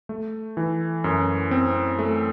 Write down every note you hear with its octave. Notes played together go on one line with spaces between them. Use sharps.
A3
E3
F#2
C4
A3